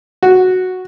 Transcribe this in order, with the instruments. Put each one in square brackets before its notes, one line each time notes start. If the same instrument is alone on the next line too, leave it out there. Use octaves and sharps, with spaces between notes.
[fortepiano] F#4